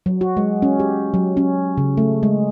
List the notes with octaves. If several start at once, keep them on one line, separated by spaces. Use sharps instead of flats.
F#3
F#4
G#3
C#4
G4
F#3
C#4
C#3
A3
G#3